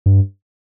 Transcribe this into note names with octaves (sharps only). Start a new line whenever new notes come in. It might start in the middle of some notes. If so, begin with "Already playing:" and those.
G2